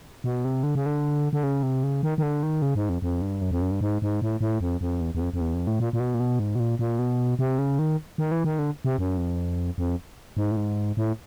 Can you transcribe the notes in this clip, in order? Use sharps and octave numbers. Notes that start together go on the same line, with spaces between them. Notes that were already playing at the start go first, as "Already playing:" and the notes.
B2
C3
D3
C#3
D3
D3
C#3
C3
C#3
D#3
D#3
D3
D#3
C#3
G#2
F2
F2
G2
F#2
F2
F#2
G2
G#2
G#2
A2
A2
F2
F2
E2
E2
F2
F2
E2
F2
A2
A#2
A#2
B2
A#2
B2
G#2
B2
A#2
A#2
B2
C3
C#3
D#3
D#3
E3
D#3
D3
C3
F#2
F2
F2
G#2
A2
G#2
A2